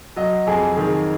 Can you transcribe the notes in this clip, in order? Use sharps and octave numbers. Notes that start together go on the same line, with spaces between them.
F#3 D#5
F2 G#4
D#3 G#4